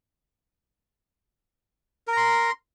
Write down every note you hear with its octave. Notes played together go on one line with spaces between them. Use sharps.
A#4 A#5 C6